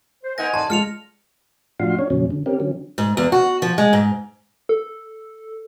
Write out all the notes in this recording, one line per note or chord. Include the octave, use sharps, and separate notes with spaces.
C5
B3 D#4 A#4 D#5 F#5 G#5 A#6
D#2 D5 A5 C6
G#3 F4 F6 C#7 F7
A2 F3 D4 F#4 F5 C6
C#4 D4 C#5
F2 A#2 C#3 F#3 C#4
D3
C4 C#4 G4 A#4
D3 F#3 C#4
G#2
E2
F#4
F3
G#3
G#2
A4